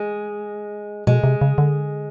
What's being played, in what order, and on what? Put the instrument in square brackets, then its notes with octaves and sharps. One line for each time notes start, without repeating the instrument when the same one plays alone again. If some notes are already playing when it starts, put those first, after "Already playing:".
Already playing: [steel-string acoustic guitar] G#3
[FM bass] B2 [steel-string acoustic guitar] G#3
[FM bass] C3
C#3
D3